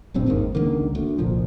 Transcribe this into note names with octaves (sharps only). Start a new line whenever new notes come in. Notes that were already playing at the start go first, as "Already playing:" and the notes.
F#1 G2 A#2 C4
G#1 D#2 G#2 D#3
C#2 D3 D#3 A#3
D2
F1 C2 A#2 F3